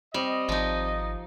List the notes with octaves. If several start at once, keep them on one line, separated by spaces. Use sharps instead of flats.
G3 C4 D#5
G#1 F3 D#4